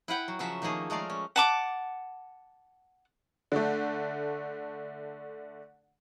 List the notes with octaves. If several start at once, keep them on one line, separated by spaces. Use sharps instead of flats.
E4 B4 F#5 G5
F#3
C#3 F3 F#3 C#4 E5
D#3 F3 A3 A#3 G#4
G#3 A3 A#4 D5 F5
C#4
F#5 A5 D6
D3 A3